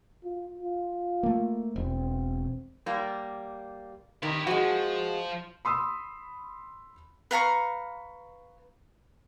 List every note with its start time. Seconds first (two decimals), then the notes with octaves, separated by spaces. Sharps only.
0.24 F4
0.58 F4
1.23 A3 A#3
1.76 E1 C4
2.86 G3 A#3
4.23 D#3 E4 G4
4.47 F3 G#3 F#4
5.65 B5 C6 D#6 E6
7.31 B4 F5 A#5 C#6